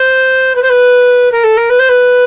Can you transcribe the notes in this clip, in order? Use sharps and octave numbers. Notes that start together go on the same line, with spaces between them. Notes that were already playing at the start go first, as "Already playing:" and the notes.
Already playing: C5
B4
C5
B4
A#4
A4
A#4
B4
C5
B4